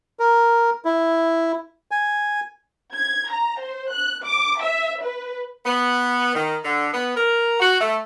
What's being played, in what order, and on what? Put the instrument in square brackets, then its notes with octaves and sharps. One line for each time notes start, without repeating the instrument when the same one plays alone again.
[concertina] A#4
E4
G#5
[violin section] G#6
A#5
C5
F#6
D6
E5
B4
[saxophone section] B3
D#3
D3
B3
A#4
F#4
A3